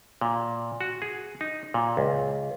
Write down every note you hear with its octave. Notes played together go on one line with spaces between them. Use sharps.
A#2
F#4
G#4
D#4
A#2
C#2